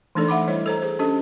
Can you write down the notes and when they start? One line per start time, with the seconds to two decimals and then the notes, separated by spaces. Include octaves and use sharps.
0.15 E3 A3 D4 D#4 A4 D5
0.28 E5 F#5 B5 D6
0.48 G3 E4 C5 C#5 D#5
0.66 A4 C5 A#5
0.82 G#4 C5
0.99 C#4 D4 G4 A4 D#5